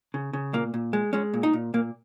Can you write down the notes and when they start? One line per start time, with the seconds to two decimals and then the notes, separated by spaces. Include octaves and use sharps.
0.14 C#3
0.33 C#3
0.53 A#2 A#3
0.74 A#2
0.93 G#3
1.13 G#3 C#4
1.34 A#2
1.43 D#4
1.53 A#2
1.74 A#2 A#3